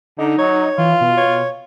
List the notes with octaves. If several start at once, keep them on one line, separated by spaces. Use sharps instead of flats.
D3 D#4
F#3 C#5
E3 F4
B2
C#5